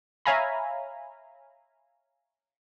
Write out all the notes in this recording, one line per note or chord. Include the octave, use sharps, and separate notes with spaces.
C#5 E5 F5 G#5 A#5 B5